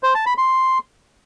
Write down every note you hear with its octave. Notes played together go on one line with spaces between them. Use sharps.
C5
A5
B5
C6